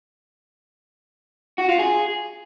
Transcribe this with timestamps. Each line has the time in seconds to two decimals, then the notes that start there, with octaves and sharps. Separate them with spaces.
1.58 F#4
1.69 F4
1.79 G#4